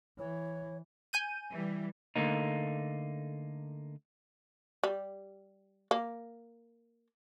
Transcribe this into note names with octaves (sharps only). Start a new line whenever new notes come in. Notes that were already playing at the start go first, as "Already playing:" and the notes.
E3 C#5
G#5 G6 D#7
E3 G3
D3 A3 A#3 D#4
G3
A#3